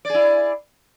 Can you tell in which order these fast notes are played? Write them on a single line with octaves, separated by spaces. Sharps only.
D5 G#4 E4